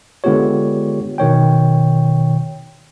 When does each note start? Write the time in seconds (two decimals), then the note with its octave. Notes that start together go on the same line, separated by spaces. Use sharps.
0.24 D3 G#3 B3 F4 G4 C#5
1.18 B2 D#3 C#5 G5